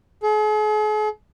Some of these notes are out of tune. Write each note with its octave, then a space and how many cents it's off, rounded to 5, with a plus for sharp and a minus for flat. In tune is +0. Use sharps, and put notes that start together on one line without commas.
G#4 +45